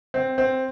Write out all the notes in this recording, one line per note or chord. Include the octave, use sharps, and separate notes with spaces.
C4
C4